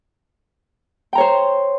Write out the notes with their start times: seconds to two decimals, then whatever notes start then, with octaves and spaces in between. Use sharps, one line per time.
1.13 G5
1.15 A#5
1.18 C#5
1.20 C5